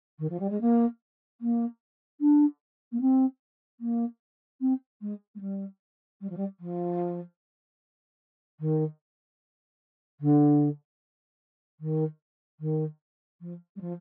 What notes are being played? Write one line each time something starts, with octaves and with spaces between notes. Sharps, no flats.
D#3
F3
G3
G#3
A#3
A#3
D4
A#3
C4
A#3
C4
G#3
G#3
G3
G3
F3
G3
F3
D#3
D3
D#3
D#3
F3
G3
F3